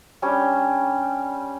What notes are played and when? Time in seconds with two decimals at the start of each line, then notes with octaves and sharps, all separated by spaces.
0.22 G3 C#4 D4 G5